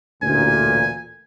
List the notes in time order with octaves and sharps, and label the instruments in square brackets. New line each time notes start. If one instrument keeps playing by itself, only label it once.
[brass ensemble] A1 D2 A#2 [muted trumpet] G#5